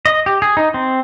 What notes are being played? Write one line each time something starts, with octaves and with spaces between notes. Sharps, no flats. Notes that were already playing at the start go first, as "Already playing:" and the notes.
D#5
G4
G#4
D#4
C4